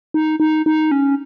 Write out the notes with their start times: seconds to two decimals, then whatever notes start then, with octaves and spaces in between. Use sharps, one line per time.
0.14 D#4
0.40 D#4
0.66 D#4
0.91 C#4